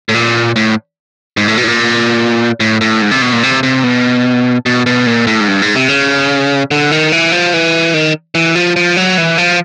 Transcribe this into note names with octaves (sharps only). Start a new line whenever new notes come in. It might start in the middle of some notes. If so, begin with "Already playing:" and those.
A2
A#2
A2
G#2
A2
B2
A2
A#2
A2
A2
G#2
C3
B2
A#2
C3
C3
B2
B2
B2
A#2
A2
G#2
G2
G#2
C3
C#3
D3
D#3
E3
F3
E3
D#3
E3
F3
F3
F#3
E3
F3